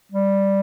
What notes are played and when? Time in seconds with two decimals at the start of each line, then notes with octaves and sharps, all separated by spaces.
0.12 G3